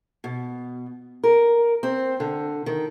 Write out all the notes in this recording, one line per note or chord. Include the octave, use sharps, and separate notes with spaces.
B2
A#4
C4
D3
D#3